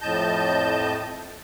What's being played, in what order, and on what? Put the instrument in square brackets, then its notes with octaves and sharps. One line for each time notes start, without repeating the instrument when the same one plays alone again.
[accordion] F2 A2 D#5 A5 G6